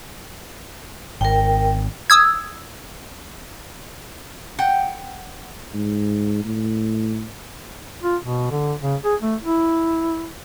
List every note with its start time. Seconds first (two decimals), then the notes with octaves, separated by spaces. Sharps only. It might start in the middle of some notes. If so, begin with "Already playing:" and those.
1.21 G#1 A#4 G5
2.10 D#6 E6 G#6
4.59 F#5 G5
5.74 G#2
6.45 A2
8.03 F4
8.22 B2
8.51 D3
8.82 C#3
9.04 G#4
9.22 A3
9.41 E4